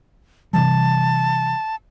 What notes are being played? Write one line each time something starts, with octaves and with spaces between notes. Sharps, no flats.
C3 E3 G3 A5